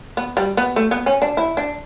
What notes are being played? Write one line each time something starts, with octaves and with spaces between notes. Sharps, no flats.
B3
G3
B3
A3
B3
C#4
D4
E4
D4